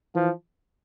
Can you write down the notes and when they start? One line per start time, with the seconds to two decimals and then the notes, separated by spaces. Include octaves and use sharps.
0.15 E3 F3